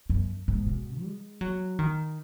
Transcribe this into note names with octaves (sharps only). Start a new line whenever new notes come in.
F#2
G#2
B2
G#3
F#3
D#3